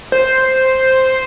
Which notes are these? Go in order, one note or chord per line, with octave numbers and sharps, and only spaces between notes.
C5